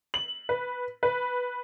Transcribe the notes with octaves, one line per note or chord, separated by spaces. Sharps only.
F#7
B4
B4